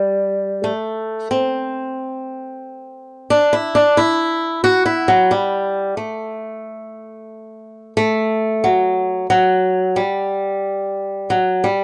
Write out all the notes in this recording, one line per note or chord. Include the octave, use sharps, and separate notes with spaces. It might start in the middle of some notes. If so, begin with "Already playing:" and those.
Already playing: G3
A3
C4
D4
E4
D4
E4
F#4
E4
F#3
G3
A3
A3
F#3
F#3
G3
F#3
G3